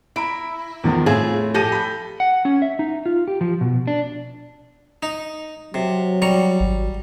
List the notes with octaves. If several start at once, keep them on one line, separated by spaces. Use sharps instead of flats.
E4 A#5 B5 D7
E2 D#3 F3
A2 C4 F4 G#4 E5
F3 G4 A4 G6 A#6 D#7
B5 G6
F#5
C#4
E5
D#4
F4
G4
F3
B2
D4
D#4
C3 F#3
G3 A#5 C#6
G#1